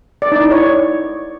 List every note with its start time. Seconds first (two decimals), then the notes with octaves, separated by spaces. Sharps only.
0.22 D5
0.32 D#4
0.42 E4
0.51 C#5